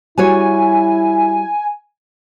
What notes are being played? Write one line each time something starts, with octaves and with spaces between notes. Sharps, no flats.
G3 E4 F#4 C#5 G#5